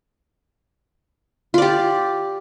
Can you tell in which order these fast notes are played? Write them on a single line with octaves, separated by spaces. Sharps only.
F4 D5 G4